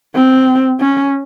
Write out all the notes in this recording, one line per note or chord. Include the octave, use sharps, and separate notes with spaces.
C4
C#4